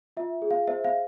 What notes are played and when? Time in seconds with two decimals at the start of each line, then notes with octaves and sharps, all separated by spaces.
0.17 F4 E5
0.42 G#4
0.51 F5
0.68 C5 E5
0.84 F5